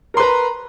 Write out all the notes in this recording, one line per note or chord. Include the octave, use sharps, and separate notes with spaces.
A#4 B4 A#5 C6